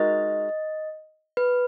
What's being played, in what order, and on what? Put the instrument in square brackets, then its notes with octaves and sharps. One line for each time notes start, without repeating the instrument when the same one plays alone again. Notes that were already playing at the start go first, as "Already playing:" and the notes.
Already playing: [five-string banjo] G#3 D#4 F#4 A#4 [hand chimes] D#5
[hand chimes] B4